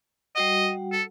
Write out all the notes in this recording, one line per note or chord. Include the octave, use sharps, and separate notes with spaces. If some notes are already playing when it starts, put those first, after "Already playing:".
G3 F#4 D#5 F#5
A4